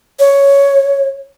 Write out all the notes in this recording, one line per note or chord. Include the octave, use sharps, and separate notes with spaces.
C#5